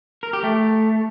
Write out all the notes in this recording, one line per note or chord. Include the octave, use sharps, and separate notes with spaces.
A#4
G4
A3